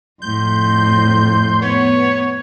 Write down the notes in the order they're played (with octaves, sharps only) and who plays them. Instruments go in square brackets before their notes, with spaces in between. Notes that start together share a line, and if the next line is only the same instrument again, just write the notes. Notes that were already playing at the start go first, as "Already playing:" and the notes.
[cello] F2 A2 [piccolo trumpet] C6 [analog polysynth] G6
[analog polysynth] B3 [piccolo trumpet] C#5